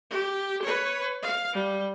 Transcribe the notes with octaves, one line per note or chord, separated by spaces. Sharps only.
G4
B4 C#5
F5
G3